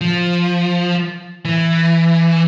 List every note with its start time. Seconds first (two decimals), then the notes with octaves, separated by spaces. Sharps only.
0.01 F3
1.45 E3